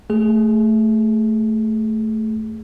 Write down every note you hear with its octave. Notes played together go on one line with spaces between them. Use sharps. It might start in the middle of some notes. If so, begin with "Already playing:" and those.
A3 G#4